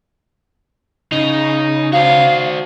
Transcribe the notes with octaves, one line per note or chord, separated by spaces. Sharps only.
C#3 D#4
F#4 C5 F5